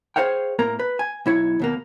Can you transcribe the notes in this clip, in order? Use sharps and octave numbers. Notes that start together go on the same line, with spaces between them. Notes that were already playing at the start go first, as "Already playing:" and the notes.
G#4 A4 C5 C#5 F5 G5
A2 A#3 A#4 A#5
B4
G#5
B1 E4 C#5
D#2 B2 A#3